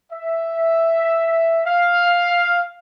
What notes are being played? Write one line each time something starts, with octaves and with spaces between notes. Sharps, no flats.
E5
F5